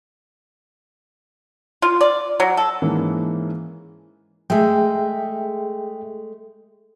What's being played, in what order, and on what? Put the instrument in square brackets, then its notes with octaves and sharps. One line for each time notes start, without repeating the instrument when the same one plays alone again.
[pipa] F4
D5
F#3
A4
[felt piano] G#2 E3 A#3 C#4
[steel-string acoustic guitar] G#3 A3 [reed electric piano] G#4 E5 G5